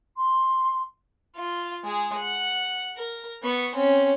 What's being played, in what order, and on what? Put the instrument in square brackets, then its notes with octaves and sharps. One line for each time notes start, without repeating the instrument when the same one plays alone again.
[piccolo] C6
[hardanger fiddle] F4
G#3 G#4
F#5
A#4
B3 C#6
C4 C#4